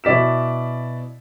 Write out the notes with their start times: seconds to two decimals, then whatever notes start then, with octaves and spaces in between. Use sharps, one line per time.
0.04 B2 E4 D5 B6 E7